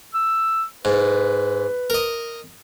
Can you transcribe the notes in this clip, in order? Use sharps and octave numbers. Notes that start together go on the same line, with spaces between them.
E6
G#2 B4
A#4 D#5